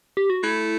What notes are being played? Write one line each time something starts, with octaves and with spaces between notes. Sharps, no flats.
G4
F#4
A3 E4